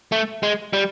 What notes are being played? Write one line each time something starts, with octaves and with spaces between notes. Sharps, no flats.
A3
G#3
G3